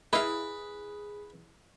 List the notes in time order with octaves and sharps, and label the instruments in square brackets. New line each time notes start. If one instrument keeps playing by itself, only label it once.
[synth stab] E4 [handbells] G#4 [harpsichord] B4 [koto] D#5 F5